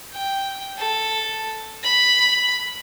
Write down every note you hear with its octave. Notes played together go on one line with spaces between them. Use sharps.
G5
A4
B5